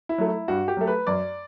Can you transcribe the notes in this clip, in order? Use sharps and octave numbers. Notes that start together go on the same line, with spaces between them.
E4
F#3 A3
E4
G2 F#4
G4
F#3 A3
B4
F#2 D5